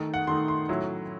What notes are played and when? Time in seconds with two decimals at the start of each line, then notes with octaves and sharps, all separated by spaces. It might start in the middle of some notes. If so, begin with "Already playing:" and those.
Already playing: D#3 A3 D#4
0.14 F#5
0.27 D#3 A3 D#4 C6
0.48 C6
0.69 A2 F#3 C#4 E4